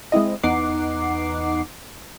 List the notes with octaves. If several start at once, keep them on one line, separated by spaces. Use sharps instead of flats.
G#3 C4 E4 D#5
E2 B3 D#4 F#5 D6 C7